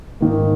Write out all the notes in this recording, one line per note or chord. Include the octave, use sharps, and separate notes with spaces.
G#2 D#3 A#3